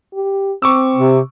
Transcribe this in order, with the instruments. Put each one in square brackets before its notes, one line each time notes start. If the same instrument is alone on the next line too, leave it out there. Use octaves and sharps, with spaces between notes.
[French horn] G4
[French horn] C4 [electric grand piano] C#6 D6 E6
[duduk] C3